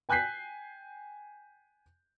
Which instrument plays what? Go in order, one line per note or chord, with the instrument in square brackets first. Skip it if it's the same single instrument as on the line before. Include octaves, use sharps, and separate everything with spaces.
[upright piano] G5 G#5 F#6 G6 B6 C7